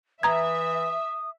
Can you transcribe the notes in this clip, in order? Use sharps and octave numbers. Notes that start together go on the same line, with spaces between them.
E3 E5 A#5 D#6 G#6